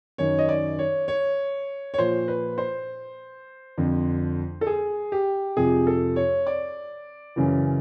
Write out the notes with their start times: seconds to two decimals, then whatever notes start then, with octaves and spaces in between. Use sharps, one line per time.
0.18 F#2 D#3 C#5
0.39 D#5
0.49 D5
0.79 C#5
1.08 C#5
1.94 C#5
1.98 A#2 F3 C5
2.28 B4
2.58 C5
3.78 F2 D3 F3
4.61 A4
4.67 G#4
5.12 G4
5.57 F2 C3 F3 G#4
5.87 A4
6.16 C#5
6.47 D5
7.36 F#2 C#3 E3